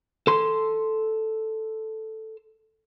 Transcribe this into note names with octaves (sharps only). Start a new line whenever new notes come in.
A4 C6